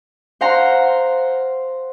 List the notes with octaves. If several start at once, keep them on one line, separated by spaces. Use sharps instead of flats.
C5 F5 F#5 A#5 C6